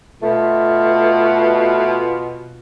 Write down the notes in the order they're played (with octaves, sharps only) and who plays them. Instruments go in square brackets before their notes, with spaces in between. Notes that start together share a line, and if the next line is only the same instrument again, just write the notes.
[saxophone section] B2 F4 [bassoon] A3